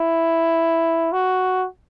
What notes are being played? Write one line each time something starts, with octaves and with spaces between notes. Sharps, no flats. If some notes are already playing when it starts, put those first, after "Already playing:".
Already playing: E4
F#4